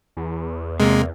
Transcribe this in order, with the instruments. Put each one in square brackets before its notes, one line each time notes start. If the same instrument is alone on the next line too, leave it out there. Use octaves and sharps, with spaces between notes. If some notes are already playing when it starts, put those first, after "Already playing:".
[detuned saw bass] E2
[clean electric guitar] C3 A#3 [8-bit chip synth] G#3